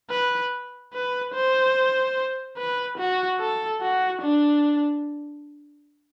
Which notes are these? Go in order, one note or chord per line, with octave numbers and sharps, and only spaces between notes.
B4
B4
C5
B4
F#4
A4
F#4
D4